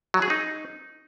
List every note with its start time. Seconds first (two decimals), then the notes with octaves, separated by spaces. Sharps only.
0.14 F#3
0.22 G#4
0.30 D#4